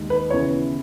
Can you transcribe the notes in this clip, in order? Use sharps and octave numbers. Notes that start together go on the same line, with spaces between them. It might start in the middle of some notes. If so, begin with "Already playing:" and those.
Already playing: D#2 D#3 G#3
B4
C#3 E3 B3 E4 C#5